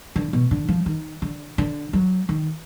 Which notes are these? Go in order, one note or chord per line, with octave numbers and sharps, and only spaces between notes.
D3
B2
D3
F3
D#3
D3
D3
F#3
D#3